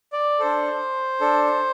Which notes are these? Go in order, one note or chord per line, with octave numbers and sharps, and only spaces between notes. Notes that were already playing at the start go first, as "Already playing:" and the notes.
D5
D4 A4 C5
D4 A4